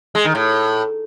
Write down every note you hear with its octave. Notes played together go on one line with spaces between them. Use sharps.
G#3
D#3
A2